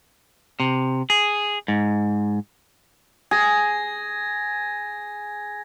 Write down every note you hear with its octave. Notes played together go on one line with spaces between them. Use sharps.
C3
G#4
G#2
G#4 G#6 A#6